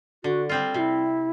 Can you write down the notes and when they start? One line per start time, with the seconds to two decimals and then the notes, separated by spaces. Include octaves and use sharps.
0.24 D3 F#4
0.49 G3 C4 F4
0.74 C3 F#4
0.78 E4